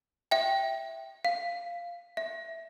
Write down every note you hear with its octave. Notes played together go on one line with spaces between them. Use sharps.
E5 G5
F5
E5